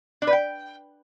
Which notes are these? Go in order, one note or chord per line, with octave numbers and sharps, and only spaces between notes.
D4
B4
G5